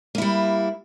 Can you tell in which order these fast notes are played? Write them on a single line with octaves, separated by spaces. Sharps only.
A#3 E4 G3